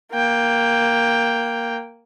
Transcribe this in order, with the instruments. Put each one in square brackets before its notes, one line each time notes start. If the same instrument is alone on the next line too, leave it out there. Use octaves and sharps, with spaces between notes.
[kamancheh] A#3 G5